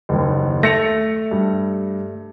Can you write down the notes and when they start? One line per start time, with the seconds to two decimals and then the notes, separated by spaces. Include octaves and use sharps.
0.09 F#1 D#2
0.63 A3 A#6 C#7 F7
1.31 G2